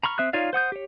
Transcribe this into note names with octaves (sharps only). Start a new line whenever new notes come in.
A#5 B5 C#6 F6
C4 E5 D#6 F#6
D#4 F4 C#5 D5 F5
C5 F#5 D#6 G6
G4 C#5